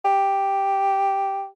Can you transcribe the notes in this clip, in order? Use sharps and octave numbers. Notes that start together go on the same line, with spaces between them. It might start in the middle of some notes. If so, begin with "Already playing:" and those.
G4